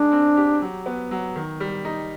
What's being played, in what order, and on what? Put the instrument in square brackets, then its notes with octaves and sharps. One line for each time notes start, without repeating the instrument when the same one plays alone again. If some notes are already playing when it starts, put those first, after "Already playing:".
Already playing: [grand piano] G#3 D#4 [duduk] D4
[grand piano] C4
G4
F#3
B3
F#3
D#3
G3
D#4